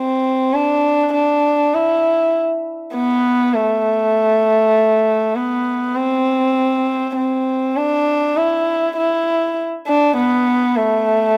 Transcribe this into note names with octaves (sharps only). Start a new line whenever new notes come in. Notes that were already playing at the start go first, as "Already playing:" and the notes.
Already playing: C4
D4
D4
E4
B3
A3
B3
C4
C4
D4
E4
E4
D4
B3
A3